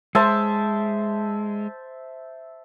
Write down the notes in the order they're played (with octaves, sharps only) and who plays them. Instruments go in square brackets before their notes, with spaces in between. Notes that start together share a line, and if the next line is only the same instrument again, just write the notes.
[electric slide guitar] G#3 [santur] C5 E5 A5